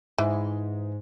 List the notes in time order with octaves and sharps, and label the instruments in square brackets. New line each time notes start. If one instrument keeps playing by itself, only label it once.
[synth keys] G#2 [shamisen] E3